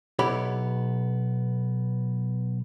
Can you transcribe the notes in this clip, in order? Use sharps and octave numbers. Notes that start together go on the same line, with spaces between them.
B1 B3 E4 G4 C#5 B5